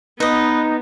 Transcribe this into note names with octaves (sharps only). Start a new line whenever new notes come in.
B3 D#4 B4 D#5